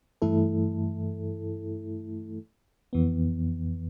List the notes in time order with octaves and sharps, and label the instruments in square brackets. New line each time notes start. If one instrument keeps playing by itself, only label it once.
[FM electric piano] G2 E3 A3 E4 A4
F2 E3 B3